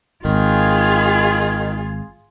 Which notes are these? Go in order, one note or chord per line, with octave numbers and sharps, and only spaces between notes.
G#1 D#3 F4 G#4